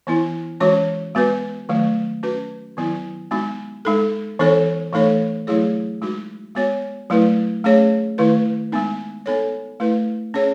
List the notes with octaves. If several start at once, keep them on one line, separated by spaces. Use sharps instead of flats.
E3 B3 E4
E3 G#3 C#4 F#4 C#5
G#3 B3 F#4 B4
D#3 F#3 A3
C#4 F#4 B4
D#3 F#3 B3 E4
G#3 B3 D#4 F#4
G#3 D#4 A4
E3 B3 D#4 A4 C#5
E3 A3 D#4 A4 C#5
F#3 A3 E4 G#4 C#5
G#3 D#4 F#4
G#3 B3 F#4 C#5
F#3 A3 E4 B4
A3 C#4 G#4 C#5
D#3 A3 E4 B4
G#3 B3 D#4
B3 D#4 A4 C#5
A3 E4 B4
C#4 G#4 C#5